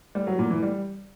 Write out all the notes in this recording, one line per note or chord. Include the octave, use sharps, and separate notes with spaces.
G3
F#3
A#2
E3
G3